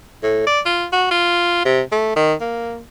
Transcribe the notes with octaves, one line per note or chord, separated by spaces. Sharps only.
A2
D5
F4
F#4
F4
C3
A3
D#3
A#3